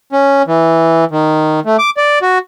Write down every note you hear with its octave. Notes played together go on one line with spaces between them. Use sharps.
C#4
E3
D#3
A3
D6
D5
F#4